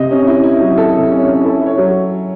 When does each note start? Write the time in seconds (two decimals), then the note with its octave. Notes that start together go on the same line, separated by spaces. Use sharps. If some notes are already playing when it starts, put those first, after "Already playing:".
Already playing: C3 D#5
0.11 C#4
0.27 E4
0.44 E4
0.60 F#3
0.77 E4 A4
0.94 C3
1.11 C#4
1.28 C#4
1.44 E4 A4
1.61 E4 C#5
1.78 F#3